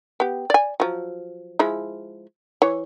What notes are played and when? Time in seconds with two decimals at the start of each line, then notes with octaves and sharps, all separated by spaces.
0.20 B3 G4
0.50 D5 G#5
0.80 F3 F#3
1.59 F3 G#3 E4
2.62 E3 C#5